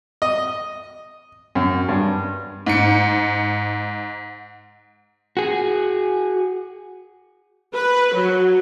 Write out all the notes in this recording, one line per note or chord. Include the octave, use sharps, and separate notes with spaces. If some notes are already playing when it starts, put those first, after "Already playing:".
D#5
F#2
G2
G#2 C#7
F#4 G#4
B4
F#3